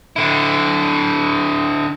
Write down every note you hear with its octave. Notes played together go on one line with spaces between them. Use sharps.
D3 E4